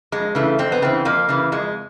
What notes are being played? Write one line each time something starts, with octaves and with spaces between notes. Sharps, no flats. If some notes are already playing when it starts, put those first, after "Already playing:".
F2 G#3
C#3 E3 A3
F2 C4
B3
C#3 E3 C4
F2 A#3
C#3 E3
F2 G#3